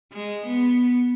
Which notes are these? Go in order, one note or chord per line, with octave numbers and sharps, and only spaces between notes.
G#3
B3